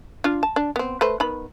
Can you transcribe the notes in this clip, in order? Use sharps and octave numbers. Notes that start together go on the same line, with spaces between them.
D4 F4
A5
D4
B3 C4
A3 B4 C5
D#3 B3 B5